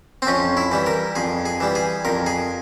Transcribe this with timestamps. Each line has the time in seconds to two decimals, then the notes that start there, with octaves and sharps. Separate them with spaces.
0.22 C4
0.27 F2 C#4
0.57 E4
0.72 E3 G3
0.86 A#4
1.15 F2 G#4
1.45 G#4
1.60 E3 G3
1.75 G#4
2.05 F2 A#4
2.26 G#4